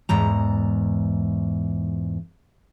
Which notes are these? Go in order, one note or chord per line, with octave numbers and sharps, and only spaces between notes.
E2 G#2 A#5